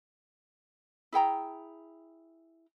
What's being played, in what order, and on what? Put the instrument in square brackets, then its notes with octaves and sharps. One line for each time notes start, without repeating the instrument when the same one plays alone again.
[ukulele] E4 G#4 G5 A#5